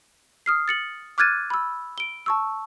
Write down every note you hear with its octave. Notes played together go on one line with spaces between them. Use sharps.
D#6 F6 C7
A6 C#7 F#7
D6 F6 F#6 G#6 A6 D#7
B5 E6
D7 G7
A5 C#6 E6